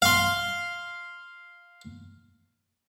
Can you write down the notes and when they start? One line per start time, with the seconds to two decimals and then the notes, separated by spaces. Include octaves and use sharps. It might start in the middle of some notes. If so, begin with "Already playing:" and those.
0.02 F5 C6